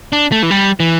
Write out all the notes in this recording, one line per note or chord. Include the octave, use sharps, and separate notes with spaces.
D4
A3
E3
G3
E3